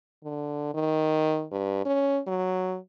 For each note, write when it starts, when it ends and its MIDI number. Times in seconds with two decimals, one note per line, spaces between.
0.24 0.74 50
0.74 1.45 51
1.52 1.82 43
1.85 2.20 61
2.27 2.77 54